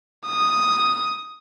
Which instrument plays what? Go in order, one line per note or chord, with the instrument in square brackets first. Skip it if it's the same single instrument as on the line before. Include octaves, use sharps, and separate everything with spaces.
[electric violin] D#6